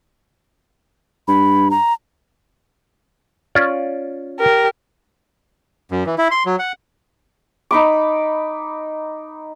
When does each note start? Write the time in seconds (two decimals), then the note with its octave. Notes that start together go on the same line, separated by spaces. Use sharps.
1.28 G2 B5
1.71 A#5
3.55 C#4 F4 D5
4.39 G4 A#4
5.91 F#2
6.06 E3
6.18 E4
6.31 C6
6.46 F#3
6.59 F#5
7.71 D#4 B5 D6